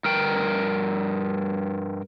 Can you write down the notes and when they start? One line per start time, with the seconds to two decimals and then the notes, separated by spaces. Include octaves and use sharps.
0.05 G2 A#4 G5